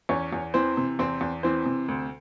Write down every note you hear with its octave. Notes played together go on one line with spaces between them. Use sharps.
E2 C#4 C#5
E2
E3 C4 C5
C3
E2 C4 C5
E2
E3 C4 C5
C3
D2